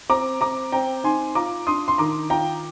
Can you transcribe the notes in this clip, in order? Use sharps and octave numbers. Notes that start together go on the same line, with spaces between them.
C4 A#5 D6
C4 A#5 D6
C4 G5 A#5
D#4 G#5 C6
F4 A#5 D6
D4 C6 D#6
C6
D#3 A#5 D6
F4 G5 A#5